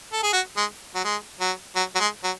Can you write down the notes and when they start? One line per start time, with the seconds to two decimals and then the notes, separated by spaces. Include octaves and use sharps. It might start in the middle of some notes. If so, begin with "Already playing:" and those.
0.12 A4
0.23 G#4
0.33 F#4
0.57 G#3
0.95 F#3
1.05 G#3
1.40 F#3
1.76 F#3
1.95 F#3
2.00 G#3
2.24 F#3